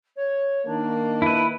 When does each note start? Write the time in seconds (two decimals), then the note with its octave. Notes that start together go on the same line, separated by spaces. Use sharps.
0.16 C#5
0.66 D#3 A#3 D4
1.22 E4 B4